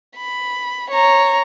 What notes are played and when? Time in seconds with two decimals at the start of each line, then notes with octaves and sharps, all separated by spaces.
0.17 B5
0.90 C#5 A#5